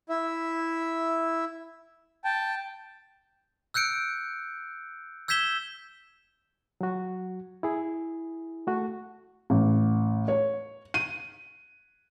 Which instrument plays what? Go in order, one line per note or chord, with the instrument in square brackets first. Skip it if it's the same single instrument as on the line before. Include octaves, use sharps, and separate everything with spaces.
[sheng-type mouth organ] E4 E5
G5 A5
[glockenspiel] E6 F#6 G6 C#7 D7
E6 G6 G#6 B6 E7 G7
[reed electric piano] F#3 F#4
E4 G#4
A3 F#4
[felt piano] A1
C#5
D#7